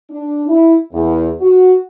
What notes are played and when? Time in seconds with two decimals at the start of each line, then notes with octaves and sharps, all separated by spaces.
0.10 D4
0.48 E4
0.92 E2
1.41 F#4